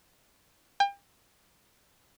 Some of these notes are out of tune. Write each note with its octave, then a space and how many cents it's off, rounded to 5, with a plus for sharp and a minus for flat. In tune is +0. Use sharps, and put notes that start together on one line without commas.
G5 +35